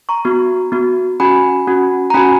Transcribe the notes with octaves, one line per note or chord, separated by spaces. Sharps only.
A#5 C#6
B3 F#4
B3 F#4
C#4 F#4 G#5 B5
C#4 F#4
A#5
C#4 F#4 G#5 B5